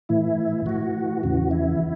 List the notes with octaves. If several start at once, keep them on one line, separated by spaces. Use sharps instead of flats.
A2 E3 E4
A2 E3 F#4
E2 C#3 E3 F#4
E4